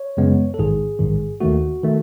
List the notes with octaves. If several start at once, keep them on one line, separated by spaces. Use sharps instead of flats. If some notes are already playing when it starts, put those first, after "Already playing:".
Already playing: C#5
F#2 C#3 G#3 B3
A4
A1 G#2 D#3 G#4
A1 G#2 D#3
D#2 D#3 A3 F#4
D#3 A3